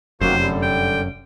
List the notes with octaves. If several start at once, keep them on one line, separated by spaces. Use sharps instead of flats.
F1 F#2 D#3 A#3 F#4 C5
D3 G3
G5